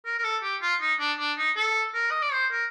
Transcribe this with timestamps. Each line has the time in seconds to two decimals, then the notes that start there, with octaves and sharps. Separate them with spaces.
0.06 A#4
0.18 A#4
0.24 A4
0.43 G4
0.61 F4
0.81 D#4
1.00 D4
1.19 D4
1.38 D#4
1.56 A4
1.94 A#4
2.11 D#5
2.22 D5
2.33 C5
2.52 A#4